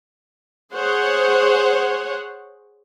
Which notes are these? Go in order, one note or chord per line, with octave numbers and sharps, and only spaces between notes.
G#4 C5 C#5 F#5